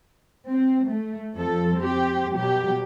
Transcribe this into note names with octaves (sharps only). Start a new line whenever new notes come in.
C4
A3
F2 F3 A4
C4 G4
B2 F#3 G4